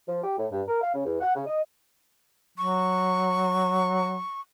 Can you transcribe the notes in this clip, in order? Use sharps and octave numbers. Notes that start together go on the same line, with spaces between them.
F3
G4
A2
G2
A#4
F5
C#3
E2
F#5
C#3
D#5
F#3 C#6